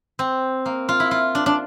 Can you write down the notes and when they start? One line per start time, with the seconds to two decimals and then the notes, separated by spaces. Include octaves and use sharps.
0.19 C4
0.66 A#3
0.89 F4
1.00 E4
1.11 F4
1.35 D4
1.46 D4